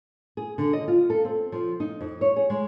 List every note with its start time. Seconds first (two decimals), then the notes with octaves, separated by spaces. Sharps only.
0.37 G#4
0.58 D3
0.73 D#5
0.88 F4
1.10 A4
1.25 C4
1.52 F3
1.80 D#4
2.01 F2
2.21 C#5
2.36 G#4
2.50 G#3